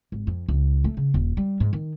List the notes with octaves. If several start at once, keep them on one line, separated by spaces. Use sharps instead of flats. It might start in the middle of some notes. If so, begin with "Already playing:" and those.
G#1
F2
C#2
A3
C#3
D#1
G3
G#2
D#3